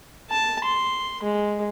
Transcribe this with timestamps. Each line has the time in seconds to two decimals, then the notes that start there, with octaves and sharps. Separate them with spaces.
0.31 A5
0.65 C6
1.23 G#3